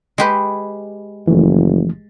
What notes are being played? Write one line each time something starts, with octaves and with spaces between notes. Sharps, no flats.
G#3 G4 B4
F#1 E3 F3 A3